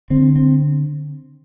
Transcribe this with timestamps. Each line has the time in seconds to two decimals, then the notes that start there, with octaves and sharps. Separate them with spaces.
0.10 D3 C4
0.36 C4